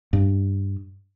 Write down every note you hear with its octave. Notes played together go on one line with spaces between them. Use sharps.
G2